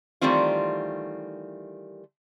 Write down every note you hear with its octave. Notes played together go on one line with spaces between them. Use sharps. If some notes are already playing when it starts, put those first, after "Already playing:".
D#3 E3 G3 A3 C4 F4